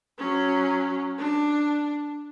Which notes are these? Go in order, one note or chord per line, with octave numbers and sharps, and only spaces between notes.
F#3 C#4
D4